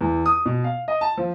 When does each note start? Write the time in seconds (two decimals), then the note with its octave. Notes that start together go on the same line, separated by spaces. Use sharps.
0.01 E2
0.26 D#6
0.46 B2
0.64 F5
0.88 D#5
1.01 A5
1.17 F3